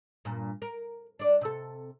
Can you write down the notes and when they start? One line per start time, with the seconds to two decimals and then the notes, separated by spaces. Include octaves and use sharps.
0.25 G2 A#2
0.62 A#4
1.19 D4 D5
1.41 C3 A4